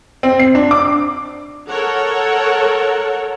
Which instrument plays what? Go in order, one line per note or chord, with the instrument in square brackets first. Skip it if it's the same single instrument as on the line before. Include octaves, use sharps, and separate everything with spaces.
[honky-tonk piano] C4
C7
D4
D6
[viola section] A4 A#4 C#5 F#5